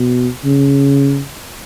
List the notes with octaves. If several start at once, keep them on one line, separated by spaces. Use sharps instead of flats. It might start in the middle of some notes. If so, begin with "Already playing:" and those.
Already playing: B2
C#3